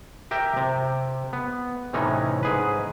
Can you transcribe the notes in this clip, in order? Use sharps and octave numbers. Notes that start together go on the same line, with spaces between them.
G4 A#4 E5 G5
C3
B3
A2 C3 E3 C#4 D#4
G#2 G#4 B4